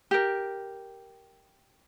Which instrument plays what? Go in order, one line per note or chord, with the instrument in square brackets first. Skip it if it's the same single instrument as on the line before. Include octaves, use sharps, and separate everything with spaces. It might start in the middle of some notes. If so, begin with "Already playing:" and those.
[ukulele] G4 A#4